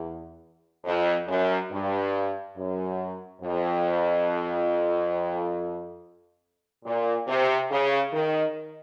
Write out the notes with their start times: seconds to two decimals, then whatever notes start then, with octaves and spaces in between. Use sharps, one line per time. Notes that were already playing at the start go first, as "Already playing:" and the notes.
Already playing: E2
0.85 F2
1.27 F#2
1.71 G2
2.56 F#2
3.42 F2
6.84 A#2
7.28 C3
7.70 C#3
8.13 D#3